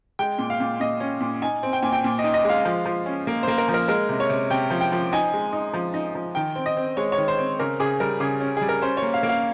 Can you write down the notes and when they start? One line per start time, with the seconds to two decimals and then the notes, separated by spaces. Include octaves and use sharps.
0.19 G#3 G5
0.38 A#2
0.50 F5
0.60 A#2
0.80 A#2 D#5
1.00 C#4
1.21 A#2
1.42 D#4 G#5
1.63 C4
1.73 G5
1.82 A#2 G#5
1.93 G5
2.04 A#2
2.19 D#5
2.24 D#4
2.34 D#5
2.44 G#3 F5
2.65 F3
2.86 F3
3.06 C#4
3.27 A#3
3.43 A#3 C5
3.58 A#4
3.68 F3
3.74 A#4
3.88 G#3 A#4
4.09 C3
4.20 C#5
4.29 C3
4.50 C3 G5
4.70 F3
4.81 G5
4.92 F3
5.13 D#4 G#5
5.33 G#3
5.53 D#4
5.74 F3
5.94 D#4
6.15 F3
6.35 D#3 G5
6.56 C4
6.66 D#5
6.77 C4
6.97 G#3 C#5
7.12 C#5
7.18 D#3
7.28 C5
7.38 C4
7.60 C#3 A#4
7.80 C#3 G#4
8.00 G3 A#4
8.20 C#3 G#4
8.41 C#4
8.57 G3 G#4
8.69 A#4
8.82 C#4 C5
8.97 C#5
9.02 A#3
9.14 F5
9.23 A#3
9.29 F5